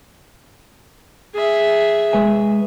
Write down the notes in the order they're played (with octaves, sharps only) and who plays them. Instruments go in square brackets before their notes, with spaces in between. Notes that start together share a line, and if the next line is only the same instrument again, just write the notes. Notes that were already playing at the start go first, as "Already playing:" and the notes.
[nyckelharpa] G#4 E5
[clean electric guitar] G#3 B4 G#5